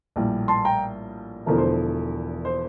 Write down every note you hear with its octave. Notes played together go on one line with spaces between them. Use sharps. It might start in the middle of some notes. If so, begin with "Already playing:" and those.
A#1 A2 G3
A5 C6
G5 A#5
E1 E2 D3 F3 A3 A#4
C5
C5